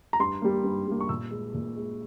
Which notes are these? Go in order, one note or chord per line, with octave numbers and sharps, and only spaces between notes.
A#5
G2 C6
G3 A#3
G2
G3 A#3
C#6
A#2 E6
G#3
A#2
G#3